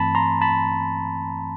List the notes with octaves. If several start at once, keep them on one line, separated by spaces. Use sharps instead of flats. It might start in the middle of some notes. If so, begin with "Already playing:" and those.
Already playing: G2 E3 A3 C4 A5 B5
A#5 C6
A5 B5